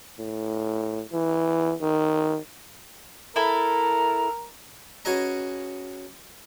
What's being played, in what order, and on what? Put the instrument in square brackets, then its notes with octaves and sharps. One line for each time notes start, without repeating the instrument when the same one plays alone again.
[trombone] A2
E3
D#3
[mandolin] E4 A4 A5 [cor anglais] A#4
[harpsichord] C#4 F#4 G#4 B4 D#5 A#5